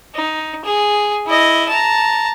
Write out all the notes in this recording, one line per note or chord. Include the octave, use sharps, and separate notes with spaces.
D#4
G#4
E4 D#5
A5 A#5